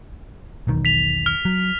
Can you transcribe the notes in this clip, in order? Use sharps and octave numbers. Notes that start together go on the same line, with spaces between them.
E1 B1 D#3
B6 F7
F6
F#3